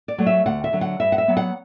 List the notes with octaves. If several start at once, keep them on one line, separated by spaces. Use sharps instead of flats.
D5
F#3 A3
E5
D2 F#5
E5
D3 F#3
F#5
G2 E5
F#5
E5
F#3 B3
F#5